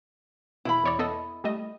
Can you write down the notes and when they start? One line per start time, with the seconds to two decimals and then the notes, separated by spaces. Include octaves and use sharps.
0.65 E2 B2 E4 B5
0.84 E2 C#5 D5
0.99 B3 A4 D#5
1.44 G3 A3 D#5